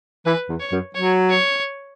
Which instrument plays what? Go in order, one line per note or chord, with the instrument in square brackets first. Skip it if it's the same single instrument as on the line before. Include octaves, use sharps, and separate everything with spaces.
[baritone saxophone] E3 [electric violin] B4
[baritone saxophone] E2
[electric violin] C#5
[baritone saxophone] F#2
[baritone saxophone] F#3 [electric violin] C#5
[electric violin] C#5